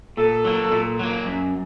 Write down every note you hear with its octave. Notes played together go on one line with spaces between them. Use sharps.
A#2 A4
F#3 A#3
A#2
F#3 A#3
F#2